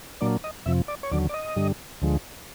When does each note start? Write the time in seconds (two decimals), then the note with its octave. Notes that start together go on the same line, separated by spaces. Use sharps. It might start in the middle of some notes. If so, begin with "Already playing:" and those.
0.21 A#2 F#3 A#3 D4 D5
0.44 D#5
0.66 F2 C3 F3 E5
0.88 D5
1.03 C#5
1.11 D#2 D3 F#3 D5
1.29 D5
1.34 D#5
1.56 G2 D3 G3
2.02 D2 D3 F3 G#3